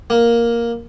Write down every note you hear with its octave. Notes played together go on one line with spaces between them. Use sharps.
A#3